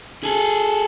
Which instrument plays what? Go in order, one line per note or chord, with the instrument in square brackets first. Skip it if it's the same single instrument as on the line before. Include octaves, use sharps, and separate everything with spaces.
[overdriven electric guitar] G#4 A4